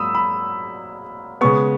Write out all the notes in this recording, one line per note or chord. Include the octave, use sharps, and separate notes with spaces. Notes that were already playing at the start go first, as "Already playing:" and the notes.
Already playing: G#2 F#3 A#3 B5 D#6 E6
B5
C#3 G#3 B3 C#6